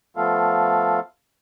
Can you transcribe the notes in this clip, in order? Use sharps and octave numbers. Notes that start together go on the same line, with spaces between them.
F3 A3 B3 F4 A4 F5